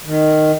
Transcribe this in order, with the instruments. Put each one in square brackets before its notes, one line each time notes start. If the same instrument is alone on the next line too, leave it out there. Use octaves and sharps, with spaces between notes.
[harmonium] D#3